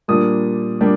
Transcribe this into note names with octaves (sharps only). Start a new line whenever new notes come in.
A#2 G3 A#3 D4 D#6
G3 A#3 D4